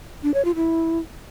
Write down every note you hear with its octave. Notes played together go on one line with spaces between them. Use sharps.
D4
C#5
F4
E4